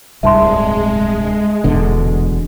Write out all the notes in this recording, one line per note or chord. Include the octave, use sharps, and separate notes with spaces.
D1 C2 G2 G#3 E5 A5 C6
D#1 E2 B2 D3